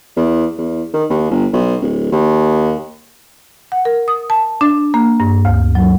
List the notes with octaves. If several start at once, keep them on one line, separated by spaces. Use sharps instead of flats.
E2
E2
D#3
D#2
G1
B1
D1
D#2
F#5
A#4
D#6
A5
D4
A#3
G2
D2
F#3